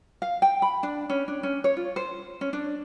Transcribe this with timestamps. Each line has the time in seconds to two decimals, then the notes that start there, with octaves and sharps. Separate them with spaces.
0.22 F5
0.42 G5
0.62 B5
0.83 D4
1.10 C#4
1.28 D4
1.43 C#4
1.64 C#5
1.77 F4
1.96 C5
2.41 C#4
2.53 D4